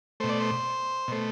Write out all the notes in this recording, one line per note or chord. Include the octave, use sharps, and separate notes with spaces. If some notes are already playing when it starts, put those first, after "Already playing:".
B2 A3 C5
D5
C5
B2 A3